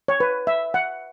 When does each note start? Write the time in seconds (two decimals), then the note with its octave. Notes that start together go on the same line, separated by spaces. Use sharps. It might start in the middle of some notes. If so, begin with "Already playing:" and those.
0.08 C#5
0.20 B4
0.47 E5
0.74 F#5